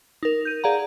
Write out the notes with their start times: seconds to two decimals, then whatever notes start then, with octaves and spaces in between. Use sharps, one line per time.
0.23 D#4 A#4
0.45 G6 D#7
0.64 G#4 D5 F5 F#5 A#5